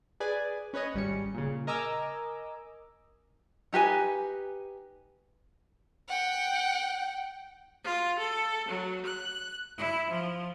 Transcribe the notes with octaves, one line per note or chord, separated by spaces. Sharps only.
G#4 B4 D5 G#5
C#4 B4 C#5 D#5
G#1 G3 C#4 C#7
A#2 C#3
A#4 D#5 G#5 A#5 D6 E6
D#4 G4 B4 G#5
F#5 G5
F4
A4
F#3
F#6
E4
F3